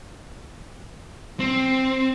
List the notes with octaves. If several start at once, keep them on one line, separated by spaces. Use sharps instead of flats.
C4